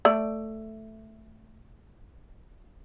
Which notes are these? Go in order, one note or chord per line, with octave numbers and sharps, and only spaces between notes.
A3 D5